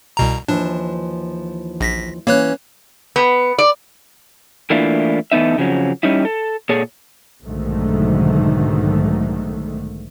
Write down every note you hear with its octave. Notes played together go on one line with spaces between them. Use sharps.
C2 B2 A#5
D#2 E3 F3 D4
A#1 A#6 B6
E3 A#3 C#4 C#5 F#6
B3
D5
E3 A3 A#3 D4 E4 F4
E3 A3 B3 D#4 E5
F2 C#3 F3 F#3
G3 C#4 D#4 E4
A4
A#2 G#4 A4 C#5
B1 G#2 D3 D#3 A3